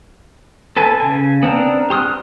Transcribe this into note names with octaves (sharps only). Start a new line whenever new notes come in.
A4 B4 G#5 A5
C#3 G#5
B3 C4 D4 A#4
G4 C6 D#6 F6 F#6